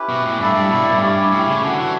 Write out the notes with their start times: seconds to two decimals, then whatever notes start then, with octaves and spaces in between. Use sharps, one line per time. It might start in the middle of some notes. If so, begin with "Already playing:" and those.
Already playing: C#4 E4 G4 B4
0.09 B2
0.25 A2
0.40 G2 E4 A4 D5
0.55 G2
0.70 B2
0.81 A2
0.92 G2
1.01 C#4 E4 G4 C#5
1.32 A2
1.47 C#3
1.62 D3 D4 F#4 C#5
1.79 E3